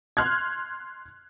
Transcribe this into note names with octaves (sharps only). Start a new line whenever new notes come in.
C6 F6 F#6 G#6